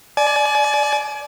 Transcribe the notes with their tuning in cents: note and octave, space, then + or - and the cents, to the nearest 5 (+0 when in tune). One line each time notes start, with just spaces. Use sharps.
D5 +0 G#5 +35